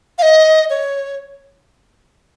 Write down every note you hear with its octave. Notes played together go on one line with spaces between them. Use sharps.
F5
D#5
C#5